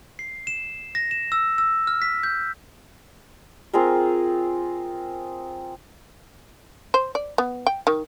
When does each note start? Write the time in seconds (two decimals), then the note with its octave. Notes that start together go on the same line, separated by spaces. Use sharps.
0.19 C7
0.47 E7
0.95 A#6
1.11 E7
1.32 E6
1.58 E6
1.87 F6
2.02 B6
2.23 G6
3.73 C4 F4 G#4 A#4
6.94 C5
7.15 D5
7.38 B3
7.67 G5
7.87 D#3